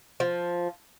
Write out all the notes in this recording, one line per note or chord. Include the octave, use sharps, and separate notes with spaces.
F3